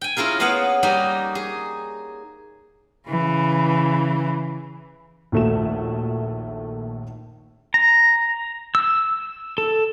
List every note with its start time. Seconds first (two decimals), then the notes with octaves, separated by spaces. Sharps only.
0.01 G5 G#5
0.17 C#4 E4 F4 G#4 A#4
0.40 A#3 B3 G#4 C#5 F5 F#5
0.83 G3 A#3 D#4 F#4 D#5
1.35 G#4
3.09 C#3 E3
5.32 A#1 D#2 A3 F#4 E7
7.74 A#5
8.75 E6
9.58 A4